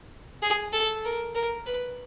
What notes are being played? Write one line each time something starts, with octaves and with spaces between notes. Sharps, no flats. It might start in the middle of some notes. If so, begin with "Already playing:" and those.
G#4
A4
A#4
A#4
B4